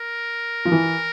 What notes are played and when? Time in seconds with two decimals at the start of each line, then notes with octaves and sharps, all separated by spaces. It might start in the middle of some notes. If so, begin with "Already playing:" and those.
Already playing: A#4
0.65 F3
0.72 E3